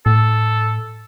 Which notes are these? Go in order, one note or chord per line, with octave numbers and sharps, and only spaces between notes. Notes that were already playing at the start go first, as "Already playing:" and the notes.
A2 A4